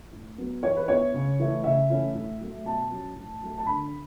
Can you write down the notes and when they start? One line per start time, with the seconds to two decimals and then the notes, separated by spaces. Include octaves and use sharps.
0.13 A2
0.38 F#3 B3
0.63 E3 C#5
0.76 B4
0.88 B3 E4 C#5
1.14 C#3
1.40 E3 A3 E4
1.64 C#3 E5
1.90 E3 A3 C#4 E4
2.15 A2
2.41 F#3 A3
2.65 B2 A5
2.91 F#3 C#4
3.16 A2
3.42 F#3 A3
3.58 A5
3.66 D3 B5